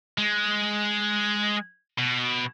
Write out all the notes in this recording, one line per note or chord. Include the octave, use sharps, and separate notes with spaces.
G#3
B2